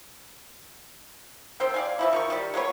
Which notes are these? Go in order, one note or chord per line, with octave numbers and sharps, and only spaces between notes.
D#3 C4 C5 G5
D5 F5 G#5
E3 F3 E4
D#3 A#4 C#6
D#3 G3
G#3 A#3 B3 C#5